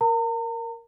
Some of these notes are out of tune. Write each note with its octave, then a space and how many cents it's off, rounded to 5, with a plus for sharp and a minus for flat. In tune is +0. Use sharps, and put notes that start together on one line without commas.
A#4 +0 A#5 -40